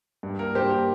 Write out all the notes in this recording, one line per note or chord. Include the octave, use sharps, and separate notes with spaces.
G2
A#3 A#4
G2 G4 C5
A#3 G4